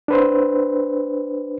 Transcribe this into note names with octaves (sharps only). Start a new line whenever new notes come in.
D4 B4 C5